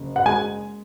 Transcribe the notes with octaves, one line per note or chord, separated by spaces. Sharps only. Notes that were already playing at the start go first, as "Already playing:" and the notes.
Already playing: F#1
F#5
G#3 G#5